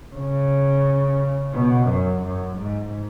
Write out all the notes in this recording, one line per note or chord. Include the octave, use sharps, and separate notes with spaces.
C#3
B2
F#2
F#2
G#2